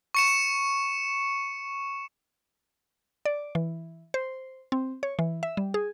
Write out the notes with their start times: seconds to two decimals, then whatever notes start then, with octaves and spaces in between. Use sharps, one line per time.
0.15 C#6 C#7 E7
3.25 D5
3.55 E3
4.14 C5
4.72 C4
5.03 C#5
5.19 E3
5.43 E5
5.57 G3
5.74 G#4